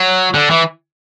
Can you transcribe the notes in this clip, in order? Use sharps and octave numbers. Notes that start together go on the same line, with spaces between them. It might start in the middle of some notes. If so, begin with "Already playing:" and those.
Already playing: F#3
D3
E3